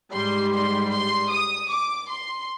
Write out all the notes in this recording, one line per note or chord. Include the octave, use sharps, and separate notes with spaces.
G#2 G3 C6
C6
C6
D#6
D6
C6